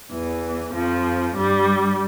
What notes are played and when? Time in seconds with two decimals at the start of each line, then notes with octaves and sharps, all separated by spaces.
0.11 E2 E3
0.74 F2 F3
1.36 G2 G3